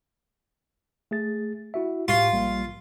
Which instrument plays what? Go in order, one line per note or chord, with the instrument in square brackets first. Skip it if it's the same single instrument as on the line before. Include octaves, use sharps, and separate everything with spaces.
[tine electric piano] A3 G#4 A6
E4 F#4 E5
[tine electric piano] A2 G4 C#6 [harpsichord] F4
[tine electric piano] A#1 G3 A#3